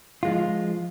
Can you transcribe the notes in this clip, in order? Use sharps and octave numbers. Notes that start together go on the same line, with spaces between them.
F3 G#3 F4